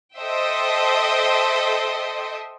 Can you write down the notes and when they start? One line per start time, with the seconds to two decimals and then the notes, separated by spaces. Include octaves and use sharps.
0.17 A4 C5 D#5 E5 G5